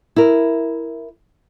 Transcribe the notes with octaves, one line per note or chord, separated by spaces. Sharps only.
E4 A#4